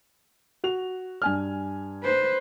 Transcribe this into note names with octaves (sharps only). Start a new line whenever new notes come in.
F#4 F7
G2 G#5 F6
B4 C5